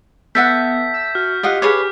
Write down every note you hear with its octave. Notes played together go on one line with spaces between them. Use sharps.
B3 A4 E5 F#5 G6 B6
E6
F#4 F6
F4 G4 D#5 F#5
G#4 B4 C#5 D6 F6